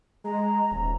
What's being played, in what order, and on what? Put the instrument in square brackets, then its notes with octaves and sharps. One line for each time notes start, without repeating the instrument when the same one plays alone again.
[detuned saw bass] G#3 [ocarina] A#5
[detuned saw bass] D#1